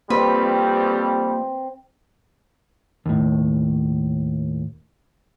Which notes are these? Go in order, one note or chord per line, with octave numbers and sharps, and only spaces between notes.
F2 G3 A#3 C4 B4
D#2 A2